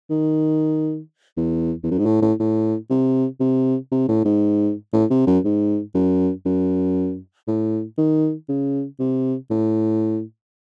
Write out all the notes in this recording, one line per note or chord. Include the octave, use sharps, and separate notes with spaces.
D#3
E2
E2
F#2
G#2
A2
A2
A2
C3
C3
C3
A2
G#2
A2
C3
F#2
G#2
F#2
F#2
A2
D#3
C#3
C3
A2